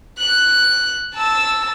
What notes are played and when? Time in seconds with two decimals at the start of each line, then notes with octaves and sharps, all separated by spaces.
0.19 F#6
1.15 A5 E6